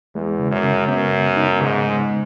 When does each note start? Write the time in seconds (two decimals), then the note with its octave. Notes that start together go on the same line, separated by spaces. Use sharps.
0.15 E2 G#3
0.39 C#3
0.51 F#2
0.63 C#3
0.87 F#2 B3
1.12 C#3
1.37 D#4
1.61 G#2 C#3
1.85 G#3